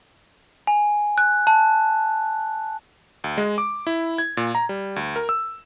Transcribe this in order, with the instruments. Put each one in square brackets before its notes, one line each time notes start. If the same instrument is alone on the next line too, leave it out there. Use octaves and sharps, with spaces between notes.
[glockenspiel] G#5
F#6
A5
[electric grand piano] D2
G#3
D6
E4
G#6
A#2
A#5
G3
D2
A#4
E6